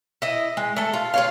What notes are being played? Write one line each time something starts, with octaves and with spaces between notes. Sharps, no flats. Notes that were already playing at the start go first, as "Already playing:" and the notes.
E4 D#5
G#3
A3 A4
F4
F4 C#5 F5